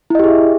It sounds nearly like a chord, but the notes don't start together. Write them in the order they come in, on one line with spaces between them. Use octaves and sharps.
E4 D#5 G4 G#4 E5